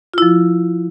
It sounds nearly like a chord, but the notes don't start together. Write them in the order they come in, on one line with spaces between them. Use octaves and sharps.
F4 E4 F3